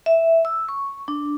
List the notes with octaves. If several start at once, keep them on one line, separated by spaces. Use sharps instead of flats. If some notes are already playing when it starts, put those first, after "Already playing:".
E5
E6
C#6
D4